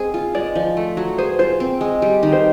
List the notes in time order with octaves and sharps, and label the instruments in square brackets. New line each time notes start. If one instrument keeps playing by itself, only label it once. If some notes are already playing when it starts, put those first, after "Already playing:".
Already playing: [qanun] G#3 C4 G#4 [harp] C5
[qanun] F4
[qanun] G#3 [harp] D5
[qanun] F3
A3
F#3
[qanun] G#4 [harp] C5
[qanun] F4 [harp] C5
[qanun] C4
G#3
G3
D#3
[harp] C5